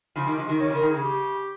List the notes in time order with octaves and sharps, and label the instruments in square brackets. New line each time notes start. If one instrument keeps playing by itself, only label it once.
[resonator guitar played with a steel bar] C#3 F3
D#3 G3
F3 G#3
D#3 G3
[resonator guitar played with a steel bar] D#3 G3 [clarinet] C#5
[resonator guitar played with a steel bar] C#3 F3
[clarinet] A#4
[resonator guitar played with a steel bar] D#3
[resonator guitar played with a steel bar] C#3 [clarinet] G#4
[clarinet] G4